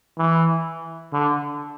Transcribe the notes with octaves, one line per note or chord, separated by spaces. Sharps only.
E3
D3